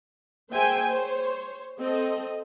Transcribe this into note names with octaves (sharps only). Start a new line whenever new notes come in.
A#3 G#4 C5 E5 G5 G#5
C5 C#5
C4 A4 D#5